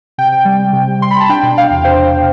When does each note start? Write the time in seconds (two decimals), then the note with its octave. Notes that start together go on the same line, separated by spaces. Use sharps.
0.18 C3 G5
0.32 C3
0.45 G3
0.60 G3
0.73 C3
0.88 G3
1.01 C3 C6
1.11 B5
1.16 C3 A5
1.29 D4 G5
1.43 B2
1.57 B2 F5
1.71 E2
1.85 B2 C5
1.98 E2